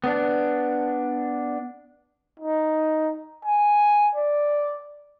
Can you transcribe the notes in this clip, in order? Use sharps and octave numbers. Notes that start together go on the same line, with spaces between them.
B3 D4
D#4
G#5
D5